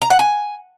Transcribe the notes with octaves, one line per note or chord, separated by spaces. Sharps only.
A#5
F#5
G#5